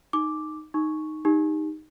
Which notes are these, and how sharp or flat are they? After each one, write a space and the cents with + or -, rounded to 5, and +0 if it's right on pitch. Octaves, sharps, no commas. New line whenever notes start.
D#4 -5 D6 +0
D#4 +0 C#6 +0
D#4 +0 G4 +25